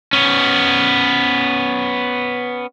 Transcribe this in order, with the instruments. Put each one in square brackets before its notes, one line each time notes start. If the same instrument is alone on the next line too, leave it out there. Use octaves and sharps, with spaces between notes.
[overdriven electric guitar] B3 C#4